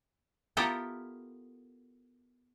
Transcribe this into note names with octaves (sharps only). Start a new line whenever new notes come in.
B3 E4 F4 G4 A4 A#4